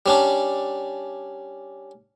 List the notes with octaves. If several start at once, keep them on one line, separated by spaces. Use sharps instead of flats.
G3 C#4 D4